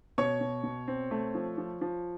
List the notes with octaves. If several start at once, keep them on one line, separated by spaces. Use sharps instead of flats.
B2 C#5 C#6
B2
B2
C4
A3
F3
F3
F3